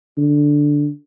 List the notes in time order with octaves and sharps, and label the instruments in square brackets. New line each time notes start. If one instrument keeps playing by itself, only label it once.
[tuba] D3